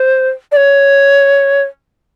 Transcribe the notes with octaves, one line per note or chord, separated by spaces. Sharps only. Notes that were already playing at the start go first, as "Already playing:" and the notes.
Already playing: C5
D5
C#5